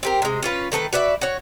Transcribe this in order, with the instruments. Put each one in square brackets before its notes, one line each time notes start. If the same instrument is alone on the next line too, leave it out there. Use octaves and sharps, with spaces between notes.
[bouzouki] C4 G4 A#4
C3 G#3
C#4 F4 B4
D#3 A3 A4 B4
F#4 B4 D5 E5
F#4 C#5